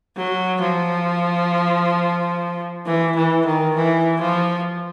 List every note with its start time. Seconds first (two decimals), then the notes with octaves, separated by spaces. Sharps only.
0.17 F#3
0.61 F3
2.86 E3
3.16 E3
3.45 D#3
3.76 E3
4.21 F3